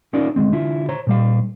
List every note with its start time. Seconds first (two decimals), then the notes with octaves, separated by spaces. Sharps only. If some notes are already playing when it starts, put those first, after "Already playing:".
0.13 C#4 D#4 F4 A#4 D5
0.36 D2 A#2 G#3 C4
0.52 D3 E4 F4
0.89 C5 C#5 A#5
1.07 A#2 G3 F5